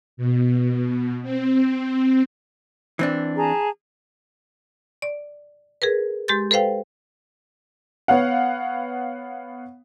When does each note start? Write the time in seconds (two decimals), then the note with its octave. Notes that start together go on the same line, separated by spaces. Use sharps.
0.17 B2
1.22 C4
2.99 E3 C4 D4
3.36 G#4 A5 A#5
5.02 D5
5.82 G#4 A#4 B4
6.28 G#3 G4 C6 G6 A6
6.51 A4 B4 C5 F5 G5
8.08 B3 C#5 F5 F#5